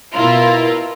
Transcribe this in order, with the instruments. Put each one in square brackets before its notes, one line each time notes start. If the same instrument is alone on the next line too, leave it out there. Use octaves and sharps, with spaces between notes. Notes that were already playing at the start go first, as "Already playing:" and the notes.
[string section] B2 E4 F4 A#4